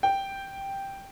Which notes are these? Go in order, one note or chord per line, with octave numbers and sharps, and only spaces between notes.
G5